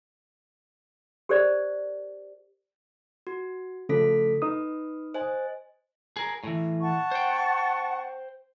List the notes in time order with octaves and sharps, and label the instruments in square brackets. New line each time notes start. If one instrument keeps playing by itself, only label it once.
[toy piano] G4 A#4 C5 D5
[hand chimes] F#4
[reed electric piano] C#3 F3 [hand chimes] A3 A4 B6
[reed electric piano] D#4 D#6 [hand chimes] B4
[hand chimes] C5 D#5 G#5
[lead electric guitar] G#4 A#4
A2 E3
[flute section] F#5 A5 C#6
[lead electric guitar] C5 G5